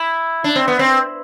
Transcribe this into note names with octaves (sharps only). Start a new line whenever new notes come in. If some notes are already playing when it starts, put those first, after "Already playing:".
Already playing: E4
D4
C4
B3
C4